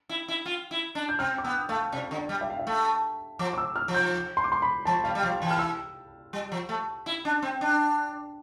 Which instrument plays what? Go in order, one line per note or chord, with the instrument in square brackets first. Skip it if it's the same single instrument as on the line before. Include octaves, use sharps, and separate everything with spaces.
[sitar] E4
E4
F4
E4
D4
[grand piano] G6
[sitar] C4 [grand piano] F6
[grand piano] D6
[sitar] B3 [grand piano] E6
[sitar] A3 [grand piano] F5
[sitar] C3 [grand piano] D5
[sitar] D3
[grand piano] D5
[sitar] G3
[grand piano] E5
F5
E5
[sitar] A3
[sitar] F3 [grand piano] D6
[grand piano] D6
E6
F6
[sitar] F3
[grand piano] G6
C6
D6
C6
B5
[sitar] F3 [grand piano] A5
[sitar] G3 [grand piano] F5
[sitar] G3
[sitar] F3 [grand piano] F5
[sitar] E3 [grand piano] G5
[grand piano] F6
E6
[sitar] G3
F3
A3
E4
D4
C4
D4